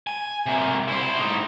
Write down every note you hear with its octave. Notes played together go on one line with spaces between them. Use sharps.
G#5
C3 A#3
E4 C5
A2 D#4